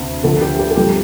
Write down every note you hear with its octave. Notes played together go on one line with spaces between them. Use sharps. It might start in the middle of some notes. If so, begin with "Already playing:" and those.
Already playing: D2 C3
D2 D3 F3 A4
G4
G4
A4
G2 F3 G4